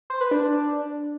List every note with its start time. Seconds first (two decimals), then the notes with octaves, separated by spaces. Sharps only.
0.10 C5
0.21 B4
0.31 D4